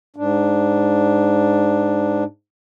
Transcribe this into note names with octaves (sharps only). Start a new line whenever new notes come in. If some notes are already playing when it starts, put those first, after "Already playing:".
G#2 D4